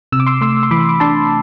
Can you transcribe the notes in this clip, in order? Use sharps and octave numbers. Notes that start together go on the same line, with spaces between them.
C3 E6
D6
C6 E6
A3 C6 E6
C6
E3 B5 D6
D6
D4 A5 C6